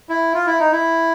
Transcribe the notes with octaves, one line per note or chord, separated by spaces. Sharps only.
E4
F4
E4
D#4
E4